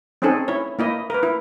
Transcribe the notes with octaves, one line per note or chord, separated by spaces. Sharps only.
C4 C#4 D#4 G#4 A4
E4 C#5
A#3 E4 D#5
A#4 B4
E4